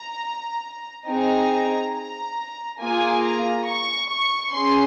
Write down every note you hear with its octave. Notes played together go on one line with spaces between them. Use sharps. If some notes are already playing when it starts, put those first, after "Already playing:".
Already playing: A#5
C4 D#4 G#4 A#5
A#5
A#3 F4 G#4 G#5
A#5
C#6
C#6
C#4 G#4 C6